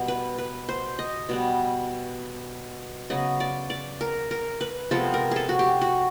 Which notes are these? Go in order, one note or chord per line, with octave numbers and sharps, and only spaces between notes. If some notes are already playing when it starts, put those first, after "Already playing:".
Already playing: B2 G3 B3
B4
B4
C5
D#5
B2 G3 B3
C#3 F#3 B3 D#5
D5
D5
A#4
A#4
B4
C3 F3 G#3 B3 A4
A#4
G#4 A4
F#4
G4
F#4